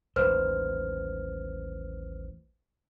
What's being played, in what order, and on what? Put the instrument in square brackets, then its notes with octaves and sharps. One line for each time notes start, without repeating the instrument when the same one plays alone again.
[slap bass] A1 D#2 [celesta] B4 C5 F6